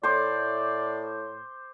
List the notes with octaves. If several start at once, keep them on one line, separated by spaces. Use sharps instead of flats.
A2 C5 D5 D6